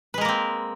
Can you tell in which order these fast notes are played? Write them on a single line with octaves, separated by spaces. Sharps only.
B4 G#3 A#4 A#3 C4